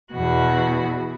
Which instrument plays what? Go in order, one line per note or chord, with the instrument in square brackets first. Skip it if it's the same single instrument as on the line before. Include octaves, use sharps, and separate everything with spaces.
[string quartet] E2 B2 F#4